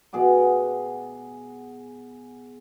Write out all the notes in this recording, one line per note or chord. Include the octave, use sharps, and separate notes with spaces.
B2 G#4 F#5 D6